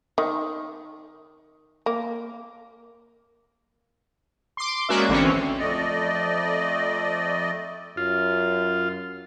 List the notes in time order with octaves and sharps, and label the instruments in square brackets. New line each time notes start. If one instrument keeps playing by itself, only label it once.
[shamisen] D#3
A#3
[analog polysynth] C6 D6
G#3 A#3 C#4 F#4 D5 E5
A1 D3 E3 C4 C#4 C#5
[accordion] F2 A3 D5 D#5
[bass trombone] F#2 [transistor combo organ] F4